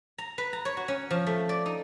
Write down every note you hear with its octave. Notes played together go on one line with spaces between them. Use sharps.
A#5
B4
A#5
C#5
F#4
C#4
F3
A3
D5
D#4